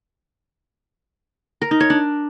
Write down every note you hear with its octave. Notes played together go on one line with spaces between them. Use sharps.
A#4
D#4
C#5
D4